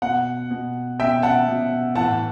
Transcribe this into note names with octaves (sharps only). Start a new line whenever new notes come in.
B2 F#5
B2
B2 E5 G5
F#5 A5
B2
A2 E3 F#5 A5